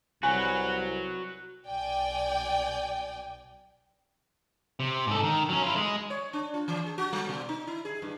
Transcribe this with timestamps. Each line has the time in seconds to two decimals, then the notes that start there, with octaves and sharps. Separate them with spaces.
0.23 C2 F#4 B4 C#5 G#5
1.66 B1 D5 G5 G#5
4.80 C3
5.07 G#2 A4
5.24 D#3
5.49 F#3 C#4
5.63 E4 F4
5.76 G#3
6.10 C#5
6.33 D4
6.54 F4
6.68 E3
6.86 G#4
6.98 F#4
7.13 G3
7.29 B2
7.49 D#4
7.67 E4
7.85 G#4
8.02 G2